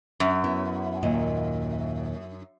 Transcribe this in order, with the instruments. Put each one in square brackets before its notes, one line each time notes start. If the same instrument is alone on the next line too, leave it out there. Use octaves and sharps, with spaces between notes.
[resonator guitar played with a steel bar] F#2
[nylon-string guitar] B3 C#4 E4
D#2 A#2 D#5